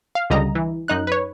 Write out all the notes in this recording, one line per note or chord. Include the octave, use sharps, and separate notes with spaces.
F5
C#2 D3 G3 D#5 A#5
E3
F#2 D#4 F#6
B4 C#5